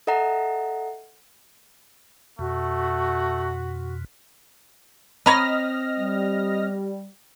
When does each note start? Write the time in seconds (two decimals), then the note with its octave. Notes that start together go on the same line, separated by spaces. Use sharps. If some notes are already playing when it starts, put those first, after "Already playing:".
0.07 A4 D#5 E5 F#5 A#5
2.39 F2 B2 A3 F#4
5.26 C4 C#5 D#5 A#5 B5 F6 A#6
5.99 G3